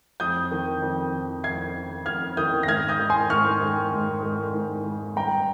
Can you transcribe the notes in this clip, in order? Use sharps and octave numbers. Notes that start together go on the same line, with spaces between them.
F2 D#6 G6
D#3
F2
D#3
F2 G#6 C7
D#3
F2 F6 G#6
D#3 D#6 G6
A#6
G#2 F6 G#6
D#6 G6
D#3
G#5 C6
G#2 C#6 F6
D#3
G#2
D#3
G#2
D#3
G2 G5 A#5